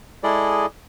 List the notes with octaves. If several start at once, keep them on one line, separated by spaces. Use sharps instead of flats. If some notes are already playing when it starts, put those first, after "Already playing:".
G#3 E4 G#4 A4 D5 D#5